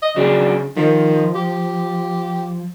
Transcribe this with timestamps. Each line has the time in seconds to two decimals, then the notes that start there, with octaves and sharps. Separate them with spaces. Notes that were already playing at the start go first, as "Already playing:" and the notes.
0.02 D#5
0.16 C#3 F#3 D4 G#4
0.77 D#3 F3
1.35 G4